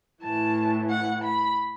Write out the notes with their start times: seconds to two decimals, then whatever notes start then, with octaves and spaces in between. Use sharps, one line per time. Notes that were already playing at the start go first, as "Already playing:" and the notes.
0.24 A2 E3 A5
0.90 F#5
1.24 B5